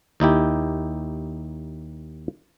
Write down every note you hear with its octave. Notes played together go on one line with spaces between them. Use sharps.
D#2 D#4 E4 G4